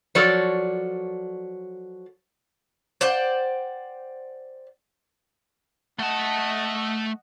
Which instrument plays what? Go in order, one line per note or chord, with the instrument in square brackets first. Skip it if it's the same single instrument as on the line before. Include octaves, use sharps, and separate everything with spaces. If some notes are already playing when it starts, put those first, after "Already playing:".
[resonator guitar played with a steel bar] F3 F#3 A4 A#4 C#5 D5
[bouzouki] C5 D5 F#5 G5
[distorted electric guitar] A3 A5 [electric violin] D#5 F#5